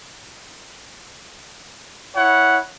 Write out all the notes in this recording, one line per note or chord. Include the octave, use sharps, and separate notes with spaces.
E4 C#5 F#5